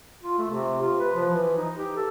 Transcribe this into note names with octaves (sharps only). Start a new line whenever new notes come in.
F4
A3
C3
F4
B4
F3
E3
D#4
G4
A4